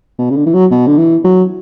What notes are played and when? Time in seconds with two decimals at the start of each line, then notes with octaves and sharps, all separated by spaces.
0.18 B2
0.30 C#3
0.36 D3
0.46 E3
0.54 F#3
0.71 B2
0.87 D3
0.98 E3
1.24 F#3